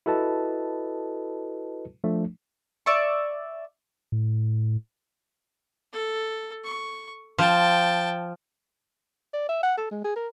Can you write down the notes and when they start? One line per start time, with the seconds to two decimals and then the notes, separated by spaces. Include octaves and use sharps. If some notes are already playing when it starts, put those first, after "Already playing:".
0.06 E4 F#4 A4 B4 D#5 A5
2.04 F3 A3 D4
2.86 D5 E5 C#6
4.12 A2
5.93 A4
6.64 C#6
7.38 F3 G5 A5
9.34 D5
9.49 E5
9.63 F#5
9.78 A4
9.91 G#3
10.04 G#4
10.16 A#4